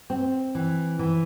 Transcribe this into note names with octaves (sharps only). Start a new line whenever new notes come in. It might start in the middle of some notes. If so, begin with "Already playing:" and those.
C4
E3
E3